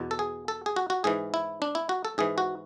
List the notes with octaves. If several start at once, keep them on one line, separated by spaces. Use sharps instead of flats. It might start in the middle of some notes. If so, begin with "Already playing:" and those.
Already playing: E2 B2
A4
G#4
A4
G#4
F#4
F#4
G#2 E3 G#4
E4
D4
E4
F#4
A4
G#2 E3 G#4
F#4